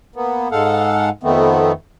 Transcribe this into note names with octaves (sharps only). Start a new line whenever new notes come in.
A#3 B3
G#2 G#3 A4 F5 F#5
F2 D#3 A3 B3 C4